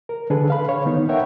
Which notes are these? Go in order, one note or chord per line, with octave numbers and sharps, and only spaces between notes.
A#4
D3 D4 G#4 A4 B4
F5 B5
C#5
D#3 B3 D#4
A#4 C#5 E5 F#5 G5